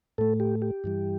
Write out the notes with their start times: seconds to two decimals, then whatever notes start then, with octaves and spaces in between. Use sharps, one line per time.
0.18 A2 A3 A4
0.40 G4
0.62 G4
0.84 G2 E3 G3